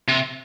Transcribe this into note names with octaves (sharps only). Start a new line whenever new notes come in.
C3